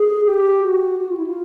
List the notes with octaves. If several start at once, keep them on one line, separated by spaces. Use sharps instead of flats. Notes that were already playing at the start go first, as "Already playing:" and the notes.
Already playing: G#4
G4
F#4
F#4
F4
E4
F4